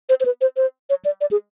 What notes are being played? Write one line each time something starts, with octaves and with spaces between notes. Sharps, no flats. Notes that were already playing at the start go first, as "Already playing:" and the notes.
C5
C5
B4
C5
C5
C#5
D5
D5
G#4